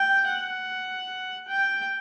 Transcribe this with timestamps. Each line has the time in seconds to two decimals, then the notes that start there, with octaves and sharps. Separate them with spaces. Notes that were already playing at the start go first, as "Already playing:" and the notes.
Already playing: G5
0.29 F#5
1.48 G5